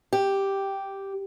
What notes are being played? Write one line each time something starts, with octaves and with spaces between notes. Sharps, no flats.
G4